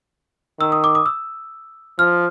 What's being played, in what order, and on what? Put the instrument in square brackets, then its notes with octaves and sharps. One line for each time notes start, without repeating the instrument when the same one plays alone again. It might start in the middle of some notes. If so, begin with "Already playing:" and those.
[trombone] D#3 [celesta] E6
[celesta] D#6
D6
D#6
E6
[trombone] F3 [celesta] F6